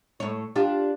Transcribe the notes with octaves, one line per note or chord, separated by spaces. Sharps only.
A2 C#5
D4 F4 G4